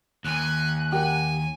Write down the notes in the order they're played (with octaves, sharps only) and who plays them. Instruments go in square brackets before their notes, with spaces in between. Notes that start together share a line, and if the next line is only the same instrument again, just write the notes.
[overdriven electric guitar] D#2 [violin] G#5 [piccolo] F#6
[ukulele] G4 A#4 F#5 [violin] G#5